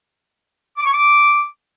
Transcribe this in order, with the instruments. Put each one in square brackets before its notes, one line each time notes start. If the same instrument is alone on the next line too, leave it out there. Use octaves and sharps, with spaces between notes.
[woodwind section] D6
C#6
D6